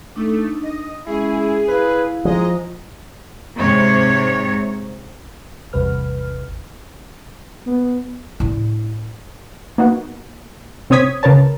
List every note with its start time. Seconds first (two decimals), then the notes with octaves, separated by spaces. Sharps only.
0.16 A3 D4 D#4
0.63 D#5
1.07 G#3 C#4 E4 G#4
1.68 E4 B4 F5
2.25 F3 G#3 D#5 A#5
3.57 G#2 C3 C#5
5.73 A1 E2 C3 G3 B4 F6
7.67 B3
8.40 A2 D4
9.78 A#3 B3 D#4 F#4
10.90 C3 C4 C#5 D#6 G#6 B6
11.23 C#2 C#3 A#4 B4 C#5 A5